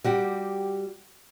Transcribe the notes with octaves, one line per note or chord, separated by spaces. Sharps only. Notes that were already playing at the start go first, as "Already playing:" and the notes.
G3 F#4 G4